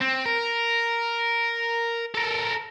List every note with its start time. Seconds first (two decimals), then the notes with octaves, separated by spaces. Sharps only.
0.01 C4
0.26 A#4
2.15 A4 A#4